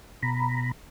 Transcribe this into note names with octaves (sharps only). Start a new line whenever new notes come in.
B2 A#5 B5